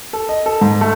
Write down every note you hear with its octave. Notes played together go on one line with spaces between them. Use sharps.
A4
D#5
A4
G#2
A3